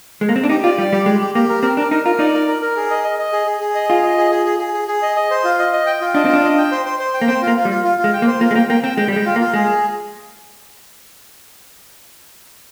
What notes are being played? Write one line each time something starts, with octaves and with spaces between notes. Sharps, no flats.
G#3
A#3
C4
D4
D#4 G4
F4 D5
G3 D5
G3 G4
G#3 G4
G4
A#3 G4
A#4
C4 A#4
D4 A#4
D#4 A#4
F4 A#4
D#4 D5
A#4
A#4
A#4
G#4
D#5
D#5
D#5
G#4
G#4
G#4
D#5
F4 G#4
D#5
G#4
G#4
G#4
G#4
G#4
G#4
D#5
D#5
C5
F4
D#5
D#5
G5
F4
D4 D#5
C4
D4 F4
D#5
G5
C5
C5
C5
G5
A#3
C4 C5
F4
A#3
F4
G3
F4
F4
F4
G#3
G5
A#3
C5
A#3 F4
G#3
A#3 G5
A#3 G5
C4 G5
G#3 G5
G3
G#3 G5
F4
A#3
F4
G#3 G#4